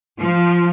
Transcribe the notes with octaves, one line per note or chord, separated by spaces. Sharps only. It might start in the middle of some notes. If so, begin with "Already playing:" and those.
F3